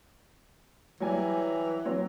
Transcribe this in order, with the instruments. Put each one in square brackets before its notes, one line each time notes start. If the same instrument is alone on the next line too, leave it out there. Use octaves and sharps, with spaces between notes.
[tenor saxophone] E3 [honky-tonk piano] F#3 G3 G#5
[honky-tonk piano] F#3 C4